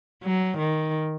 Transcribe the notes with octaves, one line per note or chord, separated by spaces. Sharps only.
F#3
D#3